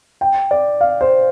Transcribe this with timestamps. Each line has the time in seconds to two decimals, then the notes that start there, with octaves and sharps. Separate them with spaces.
0.21 G5
0.51 D5
0.81 F5
1.01 C5